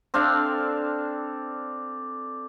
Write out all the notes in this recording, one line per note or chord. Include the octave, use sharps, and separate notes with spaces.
C4 D4 A4 F5